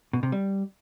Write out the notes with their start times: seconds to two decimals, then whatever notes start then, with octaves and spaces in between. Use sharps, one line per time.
0.13 B2
0.23 C3
0.32 G3